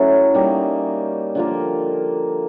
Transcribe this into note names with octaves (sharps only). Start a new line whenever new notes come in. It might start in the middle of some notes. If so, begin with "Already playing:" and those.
Already playing: F#3 A3 C#4 E4
G3 A#3 D#4
D3 F3 A#3